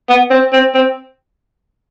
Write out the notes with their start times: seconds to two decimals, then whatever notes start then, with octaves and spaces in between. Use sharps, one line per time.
0.09 B3
0.30 C4
0.53 C4
0.75 C4